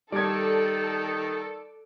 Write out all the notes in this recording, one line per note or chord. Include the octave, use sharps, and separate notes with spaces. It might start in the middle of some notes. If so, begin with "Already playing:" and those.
D#3 G3 A4 D5 G#6